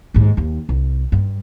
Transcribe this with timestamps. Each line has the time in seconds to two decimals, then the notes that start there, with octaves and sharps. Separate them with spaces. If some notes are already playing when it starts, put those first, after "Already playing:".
0.14 D#2 G#2
0.37 D#2 D#3
0.69 C2
1.12 G2